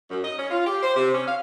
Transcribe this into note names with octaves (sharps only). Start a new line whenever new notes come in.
F#2
D#5
C#4
F4
G4
C5
C3
C#4
F5